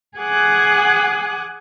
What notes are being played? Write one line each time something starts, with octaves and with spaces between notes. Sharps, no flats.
G#4 F#5 G#5 D6 D#6 F#6